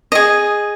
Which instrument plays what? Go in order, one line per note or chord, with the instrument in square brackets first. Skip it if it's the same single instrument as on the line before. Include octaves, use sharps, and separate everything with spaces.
[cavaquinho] G#4 D#5